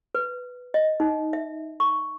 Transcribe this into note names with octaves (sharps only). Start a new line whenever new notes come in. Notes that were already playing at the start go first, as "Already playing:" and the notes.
B4
D#5
D#4
E5
C#6